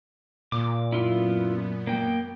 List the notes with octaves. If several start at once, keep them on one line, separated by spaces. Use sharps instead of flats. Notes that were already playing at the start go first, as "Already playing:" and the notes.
A#2 D6
F#2 B3 E4 F4
A#3 G5